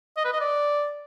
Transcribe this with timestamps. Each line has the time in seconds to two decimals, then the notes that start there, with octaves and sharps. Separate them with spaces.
0.17 D#5
0.25 B4
0.33 D#5
0.41 D5